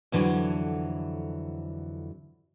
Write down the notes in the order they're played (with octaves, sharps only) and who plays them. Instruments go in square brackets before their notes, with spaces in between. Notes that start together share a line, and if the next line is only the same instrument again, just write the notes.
[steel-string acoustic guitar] F2 D3 E3 F#3